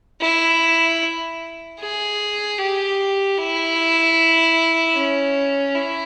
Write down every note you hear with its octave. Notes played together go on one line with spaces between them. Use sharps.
E4
G#4
G4
E4
C#4
E4